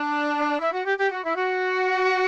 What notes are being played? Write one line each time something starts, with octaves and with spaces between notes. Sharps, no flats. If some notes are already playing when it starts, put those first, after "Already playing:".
Already playing: D4
E4
F#4
G4
G4
F#4
E4
F#4